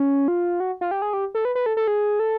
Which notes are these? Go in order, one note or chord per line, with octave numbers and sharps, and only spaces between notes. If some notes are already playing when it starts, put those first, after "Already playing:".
Already playing: C#4
F4
F#4
F4
G4
G#4
G4
A4
B4
B4
A4
A4
G#4
A4